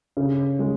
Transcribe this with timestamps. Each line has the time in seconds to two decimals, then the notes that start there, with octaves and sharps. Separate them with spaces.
0.17 C#3
0.59 G#3